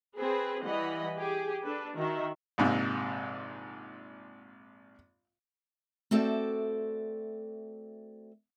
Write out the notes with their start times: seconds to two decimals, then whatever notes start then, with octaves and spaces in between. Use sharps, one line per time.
0.17 C4 G#4 B4
0.62 E3 G3 D#5 F#5 B5
1.16 G4 G#4
1.64 D4 A4 B4
1.96 D#3 F#4 E5
2.58 A#1 G#2 C3
6.11 A3 C4 F#4 A4 D5 E5